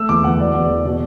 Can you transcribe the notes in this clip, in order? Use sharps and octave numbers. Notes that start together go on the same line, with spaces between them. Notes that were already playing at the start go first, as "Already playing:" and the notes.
Already playing: A3 E6
E2 D6
E2 F#5
E1 D5
E2
D5
E1
B2 D5